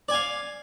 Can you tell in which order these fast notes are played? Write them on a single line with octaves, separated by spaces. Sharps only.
D5 G#5 F5